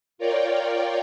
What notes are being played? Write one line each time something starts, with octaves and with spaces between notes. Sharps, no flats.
F4 A#4 C#5 D5 G5